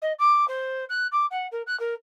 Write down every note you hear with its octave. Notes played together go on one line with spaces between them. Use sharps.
D#5
D6
C5
F#6
D6
F#5
A#4
F#6
A#4